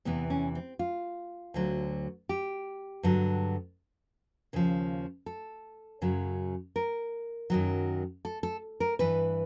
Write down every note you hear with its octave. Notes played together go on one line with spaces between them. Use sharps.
E2 C3 E3 B3
C#4
C4
F4
D2 D3 F#3
G4
G2 D3 F#3
D#2 C#3 F3
A4
F#2 C#3 F#3
A#4
F#2 D#3 F#3
A4
A4
A#4
G2 E3 B4